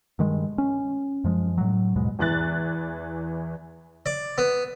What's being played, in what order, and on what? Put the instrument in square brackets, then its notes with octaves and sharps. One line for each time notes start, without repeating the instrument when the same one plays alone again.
[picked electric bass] G2 D#3 G#3
C#4
F#2 F3 G#3
A2 F#3
D#2 G#2 B2 G#3
[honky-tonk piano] E2 E3 F#6 A6
[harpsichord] D5
B3